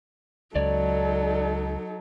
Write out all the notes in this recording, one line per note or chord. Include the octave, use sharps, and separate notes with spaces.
C#2 F#3 D#4 A4 C#5 D5